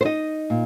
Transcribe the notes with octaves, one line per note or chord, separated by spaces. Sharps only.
C5
D#4 D#5
A#2